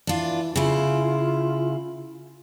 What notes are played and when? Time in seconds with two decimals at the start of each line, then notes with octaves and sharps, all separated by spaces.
0.07 E3 D4 F4
0.56 C#3 E4 F4